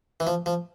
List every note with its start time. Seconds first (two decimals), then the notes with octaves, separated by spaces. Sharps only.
0.20 E3
0.27 F3
0.46 F3